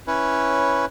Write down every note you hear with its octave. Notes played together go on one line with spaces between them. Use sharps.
C#4 E4 B4 C#5